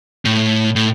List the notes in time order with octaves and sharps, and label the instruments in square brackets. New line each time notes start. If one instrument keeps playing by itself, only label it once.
[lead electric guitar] A2
A2